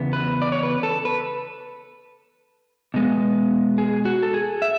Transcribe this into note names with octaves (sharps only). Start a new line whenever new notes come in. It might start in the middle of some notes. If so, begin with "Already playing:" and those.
Already playing: E2 C#3 B3
B4
D5
C#5
B4
A4
B4
B2 G#3 B3
G#4
F#4
A4
G#4
E5